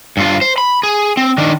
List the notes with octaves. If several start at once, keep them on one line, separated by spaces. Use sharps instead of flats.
G2 F4
C5
B5
G#4
C4
D#3 D4